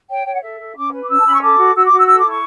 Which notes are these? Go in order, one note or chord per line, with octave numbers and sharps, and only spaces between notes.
C#5 G5
C#5 G5
F#5
A4 E5
A4
C#4 D6
B4
D6
C#4 E6
A5
C#4 B5
C#6
A4 D6
F#4
F#4 E6
D6
F#4
E6
A4 E6
D6
E4 C#6